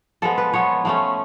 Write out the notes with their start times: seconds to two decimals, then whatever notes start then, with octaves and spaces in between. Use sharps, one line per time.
0.22 F3 G#3 B3 A4
0.38 B4
0.53 F3 B3 C#5
0.85 F3 A3 C#4